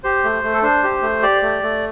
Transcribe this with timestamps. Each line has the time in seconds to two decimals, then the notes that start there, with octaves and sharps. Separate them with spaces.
0.04 G4 C5
0.24 A3
0.44 A3
0.53 A4
0.63 D4 C5
0.84 G4
1.02 A3
1.22 G4 D5
1.43 A3
1.63 A3